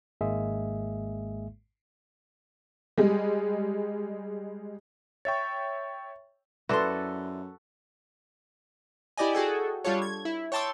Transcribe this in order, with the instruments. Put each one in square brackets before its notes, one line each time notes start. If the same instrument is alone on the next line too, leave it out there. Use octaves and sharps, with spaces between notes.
[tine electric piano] G#1 G#2 G#3 A#3 G#4 E5
[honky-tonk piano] G3 G#3
[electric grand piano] C#5 E5 G5 [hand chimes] C#6 A6
[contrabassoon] F#2 [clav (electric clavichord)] E4 D5 [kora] F#4 A4 [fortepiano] B4 C6
[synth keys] E4 G4 D5 D#5 G#5
F#4 G#4 A4 G5
G3 D4 F4 A4 C#5
G#6
E4
C#5 G5 A5 C6 D6 E6